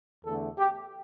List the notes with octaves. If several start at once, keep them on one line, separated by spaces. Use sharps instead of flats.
E2 D3 A3 A4
G4